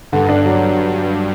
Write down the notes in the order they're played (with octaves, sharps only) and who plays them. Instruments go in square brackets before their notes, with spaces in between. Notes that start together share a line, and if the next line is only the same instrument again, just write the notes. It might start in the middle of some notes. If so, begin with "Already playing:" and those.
[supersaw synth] G2 [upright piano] D3
[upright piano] D4
F#3